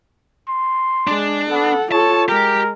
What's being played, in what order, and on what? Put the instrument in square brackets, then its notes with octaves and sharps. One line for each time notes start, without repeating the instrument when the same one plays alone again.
[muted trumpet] C6
[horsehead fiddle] G#3 [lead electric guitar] D4
[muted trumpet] B3 [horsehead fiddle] A4 F#5
[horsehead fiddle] F4 A4 [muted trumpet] C#5 [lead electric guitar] A5
[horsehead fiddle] G#3 [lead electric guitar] G4 [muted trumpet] A#4